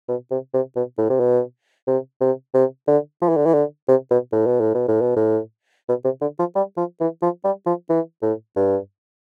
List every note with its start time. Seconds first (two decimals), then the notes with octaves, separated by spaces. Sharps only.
0.09 B2
0.31 C3
0.54 C3
0.76 B2
0.98 A2
1.10 C3
1.20 B2
1.87 C3
2.21 C3
2.54 C3
2.87 D3
3.22 F3
3.29 E3
3.37 D3
3.46 E3
3.54 D3
3.88 C3
4.11 B2
4.33 A2
4.46 B2
4.61 A2
4.75 B2
4.88 A2
5.01 B2
5.16 A2
5.89 B2
6.05 C3
6.21 D3
6.39 F3
6.55 G3
6.77 F3
7.01 E3
7.22 F3
7.44 G3
7.66 F3
7.90 E3
8.22 A2
8.56 G2